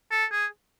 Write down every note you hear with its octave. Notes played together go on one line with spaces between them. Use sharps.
A4
G#4